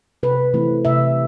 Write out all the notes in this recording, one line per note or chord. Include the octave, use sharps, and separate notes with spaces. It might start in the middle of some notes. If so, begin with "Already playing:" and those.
C3 B4
E3 A3 C4
C3 E5